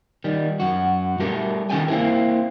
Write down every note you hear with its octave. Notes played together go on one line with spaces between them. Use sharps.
D#3 G3
F#2 F#4
G3 A3 G4 A#4
D#3 C#4 G4 A4 G5 G#5
A#3 C4 E4 G#4 A#4